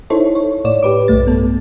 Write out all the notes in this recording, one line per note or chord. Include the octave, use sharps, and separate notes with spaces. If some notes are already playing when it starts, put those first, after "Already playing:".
D#4 E4 A4 C5 C#5
C#5
A2 C#5 D5 E7
G4 B4 D6
B1 G2 A3 A6
B3 A4